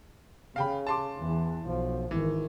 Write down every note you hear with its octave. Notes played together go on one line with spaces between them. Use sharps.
C#3 F5 G5 B5
A5 C6 D6
E2 E3
B1 F3
G#1 D#3 E3